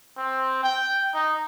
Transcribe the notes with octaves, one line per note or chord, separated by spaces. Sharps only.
C4
G5
D#4